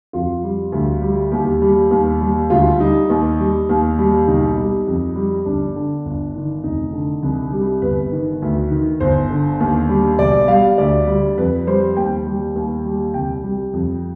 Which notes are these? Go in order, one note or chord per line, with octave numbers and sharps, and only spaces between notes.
F2 F4
G3
D2
G3
D#2 G4
G3
D#2
G3
D2 F4
G3 D#4
D#2
G3
D#2
G3
B1 D#4
G3
F2
G3
G1 D4
D3
G1
D#3
F1 D#4
D3
C2
G3
G1 B4
D#3
D2
D#3
G1 C5
D3
D#2
G3
B1 D5
G3 F5
D2 D5
G3
F2 B4
G3 C5
D#2 G5
G3
D#2
G3
C2 G5
G3
F2